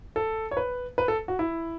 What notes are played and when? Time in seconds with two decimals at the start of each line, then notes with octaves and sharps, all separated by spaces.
0.16 A4
0.51 C#5
0.57 B4
0.98 B4
1.08 A4
1.28 F#4
1.39 E4